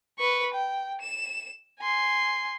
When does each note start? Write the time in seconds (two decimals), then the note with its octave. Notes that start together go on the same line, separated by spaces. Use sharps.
0.18 B4 C#6
0.54 G5
1.01 E7
1.80 G#5 C6